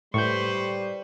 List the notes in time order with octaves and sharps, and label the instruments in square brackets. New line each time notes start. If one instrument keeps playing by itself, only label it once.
[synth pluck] A2 [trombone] G3 [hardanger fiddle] B4 C5 [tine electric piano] C#6 G6